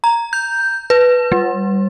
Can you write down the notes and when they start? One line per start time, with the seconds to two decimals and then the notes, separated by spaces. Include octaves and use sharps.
0.04 A#5
0.33 G6
0.90 B4
1.32 G3